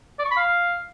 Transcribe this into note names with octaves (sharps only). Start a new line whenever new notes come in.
D5
C#6
B5
F5